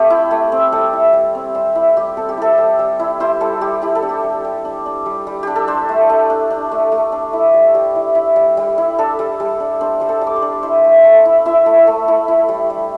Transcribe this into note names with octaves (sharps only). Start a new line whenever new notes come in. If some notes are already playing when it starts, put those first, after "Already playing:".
Already playing: A3 C4 G4
E4
A3
C4
G3 A4
E4
G3
C4
G3 C5
E4
G3 G4
C4 A4
G4
E4 A4
G3
G3
E4
E4 C5
G3 A4
G3 G4
E4 G4
A4
D4
G4
G3
G3
D4
D4
G3
G3
D4 G4
A4
D4 C5
A3
A3
D4
D4
A3
A3
D4
E4
G3
G3
E4
E4
G3
G3
E4
D4 A4
G3
G3
D4
D4 C5
G3 C5
A4
G3
D6
C6
D4
E4 C5
A3
A3
E4
E4 E5
A3
A3
E4
E4
G3
G3